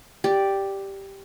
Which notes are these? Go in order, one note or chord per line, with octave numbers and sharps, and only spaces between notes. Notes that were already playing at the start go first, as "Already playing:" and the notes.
G4 D5